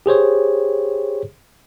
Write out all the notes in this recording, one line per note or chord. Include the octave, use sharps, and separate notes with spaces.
G4 G#4 C5 C#5